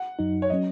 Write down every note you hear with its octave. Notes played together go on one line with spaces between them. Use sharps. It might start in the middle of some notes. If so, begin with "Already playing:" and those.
Already playing: F#5
F#2 F#3 D#4
C#5
F#3 C#4 D#5